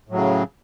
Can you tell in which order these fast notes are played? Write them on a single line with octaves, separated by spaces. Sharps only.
A2 F#3 C#3